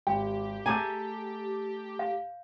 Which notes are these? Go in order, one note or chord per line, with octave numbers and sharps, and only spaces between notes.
G#1 G4 G5
A3 G#4 G#5 A#5 D6 G6
F5